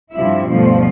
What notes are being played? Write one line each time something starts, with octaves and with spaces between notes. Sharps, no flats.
G2 C3 F3 E4 E5
D2 G2 B2 F3 G3